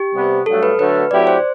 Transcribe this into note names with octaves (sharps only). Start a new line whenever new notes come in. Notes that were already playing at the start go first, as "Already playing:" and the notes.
Already playing: G4
C3 G3 B3
G2 F#3 A3 A4
B4
D3 F#3 A3 B4
A2 F#3 C4 E4 G4 D5
C5